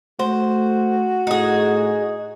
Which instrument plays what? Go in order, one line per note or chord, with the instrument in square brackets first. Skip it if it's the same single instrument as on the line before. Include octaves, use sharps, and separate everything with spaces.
[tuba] A3 [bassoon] F#4 [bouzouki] C5
[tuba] A2 [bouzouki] D#4 G#4